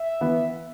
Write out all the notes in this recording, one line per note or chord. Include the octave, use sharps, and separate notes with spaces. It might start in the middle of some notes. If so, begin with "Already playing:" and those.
Already playing: E5
E3 B3